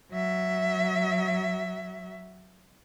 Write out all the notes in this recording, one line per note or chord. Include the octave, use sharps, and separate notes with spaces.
F#3 E5